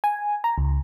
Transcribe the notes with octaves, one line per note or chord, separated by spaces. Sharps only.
G#5
A#5
C#2